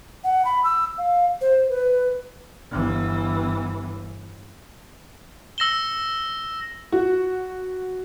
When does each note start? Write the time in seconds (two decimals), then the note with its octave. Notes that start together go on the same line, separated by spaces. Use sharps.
0.24 F#5
0.45 B5
0.64 E6
0.98 F5
1.41 C5
1.70 B4
2.71 G1 E3
5.58 E6 A#6 E7 G7
6.92 F#4